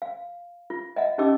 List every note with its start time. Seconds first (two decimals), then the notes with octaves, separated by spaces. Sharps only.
0.02 F5
0.70 F4
0.96 D#5 E5 F#5
1.18 C#4 D#4 G4 D#5 D6 E6